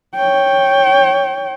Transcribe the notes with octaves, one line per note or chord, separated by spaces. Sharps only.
C#5 G5